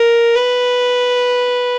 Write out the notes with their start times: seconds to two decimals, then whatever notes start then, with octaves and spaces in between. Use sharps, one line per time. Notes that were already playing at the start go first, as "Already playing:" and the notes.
Already playing: A#4
0.35 B4